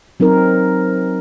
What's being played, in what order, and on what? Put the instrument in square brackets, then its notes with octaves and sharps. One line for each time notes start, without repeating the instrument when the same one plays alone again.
[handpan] F#3 C4 D#4 A#4